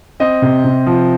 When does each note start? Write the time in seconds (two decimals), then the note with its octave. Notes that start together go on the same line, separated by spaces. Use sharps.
0.20 C4 D#5
0.42 C3
0.64 C3
0.87 F3